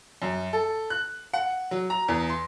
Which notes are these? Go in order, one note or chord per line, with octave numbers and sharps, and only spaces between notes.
F#2
A4
F#6
F#5
F#3
A#5
E2
C6